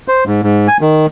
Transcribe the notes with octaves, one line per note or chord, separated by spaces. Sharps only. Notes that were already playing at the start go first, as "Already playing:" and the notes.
C5
G#2
G#2
G#5
D#3